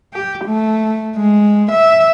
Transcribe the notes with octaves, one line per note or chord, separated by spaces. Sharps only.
G4
A3
G#3
E5